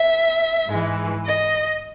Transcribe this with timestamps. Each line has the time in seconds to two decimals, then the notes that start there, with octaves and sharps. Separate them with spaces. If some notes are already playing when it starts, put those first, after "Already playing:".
Already playing: E5
0.67 G#2 E3 G#3
1.24 D#5